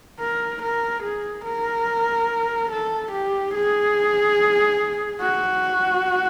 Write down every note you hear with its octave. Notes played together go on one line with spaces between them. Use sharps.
A#4
A#4
G#4
A#4
A4
G4
G#4
F#4